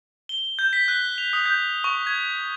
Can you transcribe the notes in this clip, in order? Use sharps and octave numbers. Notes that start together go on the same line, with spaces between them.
G7
G6
B6
F#6
F7
D#6
G6
C#6
G#6